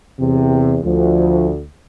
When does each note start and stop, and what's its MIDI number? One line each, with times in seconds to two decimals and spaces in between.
0.20 0.79 40
0.20 0.79 48
0.85 1.64 38
0.85 1.50 53